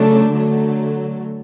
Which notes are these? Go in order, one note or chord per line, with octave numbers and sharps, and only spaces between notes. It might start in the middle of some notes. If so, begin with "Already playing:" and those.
Already playing: C#3 F#3 A3 D4
D3 F#3 A3